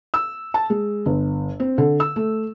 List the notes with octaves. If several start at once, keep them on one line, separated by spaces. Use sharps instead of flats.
E6
A5
G#3
G1
C4
D3
E6
A3